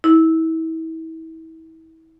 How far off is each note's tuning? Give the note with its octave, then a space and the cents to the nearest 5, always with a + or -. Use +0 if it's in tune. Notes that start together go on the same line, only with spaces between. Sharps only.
E4 -35